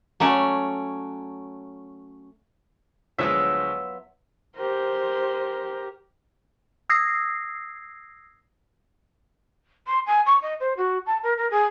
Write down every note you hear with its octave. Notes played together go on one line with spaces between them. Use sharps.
F#3 A3 C#4 D5
D2 F3 F#3 G#3 B3 F4 E5
G4 A#4 C5
D#6 E6 G#6 A#6 C7
C6
G#5
C#6
D#5
C5
F#4
A5
A#4
A#4
G#4